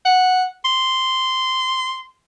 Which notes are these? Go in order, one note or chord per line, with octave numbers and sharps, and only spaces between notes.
F#5
C6